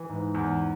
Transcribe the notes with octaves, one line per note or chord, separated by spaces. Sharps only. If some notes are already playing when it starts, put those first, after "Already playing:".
Already playing: E3
G#2
E2